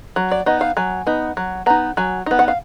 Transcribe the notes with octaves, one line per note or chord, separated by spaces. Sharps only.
F#3
D5
B3 D#4 D#5
F5
F#3 G#5
B3 D#4
F#3
B3 D#4 A#5
F#3 G#5
B3 D#4
F#5
F5